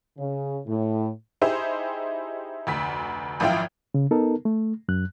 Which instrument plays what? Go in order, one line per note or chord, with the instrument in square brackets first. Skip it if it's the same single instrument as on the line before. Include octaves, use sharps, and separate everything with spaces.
[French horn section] C#3
A2
[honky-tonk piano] D#4 E4 G4 G#4 C5 E5
F1 D2 B6
G#1 F#2 F3 E4 F4 G5
[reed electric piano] C#3
B3 D#4 A4 A#4
A3
F#2 F#6